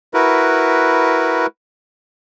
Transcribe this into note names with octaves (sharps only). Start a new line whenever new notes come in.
E4 F#4 A#4 B4